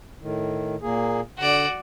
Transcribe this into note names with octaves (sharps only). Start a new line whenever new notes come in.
A2 D#3
A#2 A#3 G#4
D3 F#4 D5